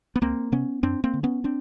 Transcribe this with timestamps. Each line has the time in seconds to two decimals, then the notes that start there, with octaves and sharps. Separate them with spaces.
0.16 B3
0.21 C#2 A#3 C4
0.52 C3 B3 C#4
0.83 F#2 C4 D4
1.04 A#3 C4
1.14 D3
1.23 B3 C#4
1.44 C4 D4